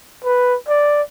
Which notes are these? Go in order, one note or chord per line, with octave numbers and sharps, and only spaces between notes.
B4
D5